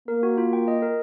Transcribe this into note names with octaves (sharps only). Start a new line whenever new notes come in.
A#3 A#4
F#4
F4
G5
D#5
A#4